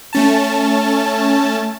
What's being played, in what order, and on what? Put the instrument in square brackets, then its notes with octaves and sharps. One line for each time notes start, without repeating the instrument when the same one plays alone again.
[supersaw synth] A3 C#4 A5